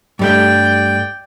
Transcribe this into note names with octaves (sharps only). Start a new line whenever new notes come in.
G2 G3 A3 D5 G5